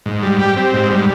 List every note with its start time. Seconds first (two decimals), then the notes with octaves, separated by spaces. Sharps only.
0.06 G#2
0.23 G3
0.39 G4
0.57 C4
0.74 G#2
0.91 G3